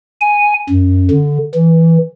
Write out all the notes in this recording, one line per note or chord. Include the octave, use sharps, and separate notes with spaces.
G#5
F#2
D3
E3